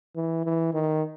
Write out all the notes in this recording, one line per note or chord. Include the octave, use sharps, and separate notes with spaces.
E3
E3
D#3